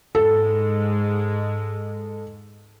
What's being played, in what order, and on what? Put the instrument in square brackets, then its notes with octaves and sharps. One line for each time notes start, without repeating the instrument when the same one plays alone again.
[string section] G#2 G#3 [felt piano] A4